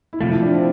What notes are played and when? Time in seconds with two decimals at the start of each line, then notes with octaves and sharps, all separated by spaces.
0.13 E4
0.21 C3 F3 A3 F4
0.31 E4
0.42 D4
0.51 C4